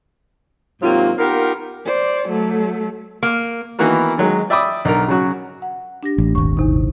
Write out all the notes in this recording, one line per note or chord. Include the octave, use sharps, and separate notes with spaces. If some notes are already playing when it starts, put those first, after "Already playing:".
G#2 C3 F#3 A#3 C4 F4
B3 D#4 F4 G4 A#4
C5 D5
F#3 A3
A#3
D#3 E3 A#3 B3 F#4 A#4
D#3 F#3 G#3
D5 E5 G5 B5 D6 D#6
B1 D4 A#4
C#3 F#3 F#4
F#5
D4 G4 A#6
A1
D#1 G#1 C#6
E2 C3 D#4